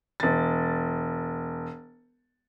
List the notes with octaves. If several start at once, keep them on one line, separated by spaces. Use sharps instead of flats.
E1 A6